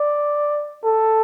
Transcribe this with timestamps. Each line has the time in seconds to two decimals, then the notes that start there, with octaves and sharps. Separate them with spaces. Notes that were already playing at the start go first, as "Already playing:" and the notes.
Already playing: D5
0.84 A4